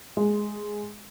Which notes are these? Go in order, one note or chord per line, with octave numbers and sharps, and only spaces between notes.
G#3